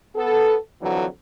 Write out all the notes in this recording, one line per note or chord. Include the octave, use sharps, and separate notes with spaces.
B3 A4
F2 D3 E3 F#3